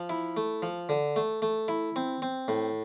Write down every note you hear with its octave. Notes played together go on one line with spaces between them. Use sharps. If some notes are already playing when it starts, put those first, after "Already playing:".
Already playing: F3
E4
A3
F3
D3
A3
A3
E4
C4
C4
A2